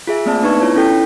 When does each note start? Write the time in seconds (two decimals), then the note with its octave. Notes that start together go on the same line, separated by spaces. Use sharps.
0.07 F4 G#4 E5 G#5
0.26 A3 A#3 C4 D5 E5 A5
0.42 B3 D4 D#4 B4 C#6 G#6
0.62 E4 F4 C#5
0.76 C#4 E4 A4 G5 G6 B6